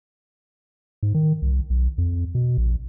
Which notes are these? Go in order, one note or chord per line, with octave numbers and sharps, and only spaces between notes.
G#2
D#3
C2
B1
F2
B2
A#1